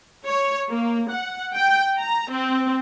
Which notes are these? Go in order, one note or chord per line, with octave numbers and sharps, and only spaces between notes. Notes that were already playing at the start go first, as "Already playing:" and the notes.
C#5
A#3
F#5
G5
A#5
C4